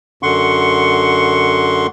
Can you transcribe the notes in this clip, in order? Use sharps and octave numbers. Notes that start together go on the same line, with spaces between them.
F#2 D3 F#5 C6 C#6